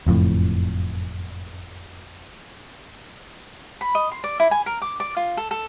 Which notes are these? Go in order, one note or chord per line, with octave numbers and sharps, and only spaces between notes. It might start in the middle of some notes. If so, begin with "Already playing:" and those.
F#1 F2 A2
B5
D#5
C6
D5
E4
G#5
A#4
D6
D5
F4
A4
A4